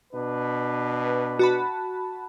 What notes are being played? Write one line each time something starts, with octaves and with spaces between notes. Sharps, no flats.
B2 D4 B4
F#4 A5 B5